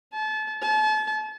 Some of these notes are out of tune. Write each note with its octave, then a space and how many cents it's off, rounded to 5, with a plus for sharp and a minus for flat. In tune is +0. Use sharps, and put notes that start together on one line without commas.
A5 -30
A5 -35